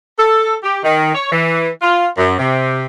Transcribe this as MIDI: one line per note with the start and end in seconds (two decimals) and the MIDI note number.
0.18 0.54 69
0.63 0.77 67
0.83 1.11 51
1.13 1.30 73
1.31 1.69 52
1.82 2.07 65
2.17 2.34 42
2.39 2.84 48